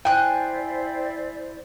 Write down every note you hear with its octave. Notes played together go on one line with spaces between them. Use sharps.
E4 C5 D5 G5 G#5 F#6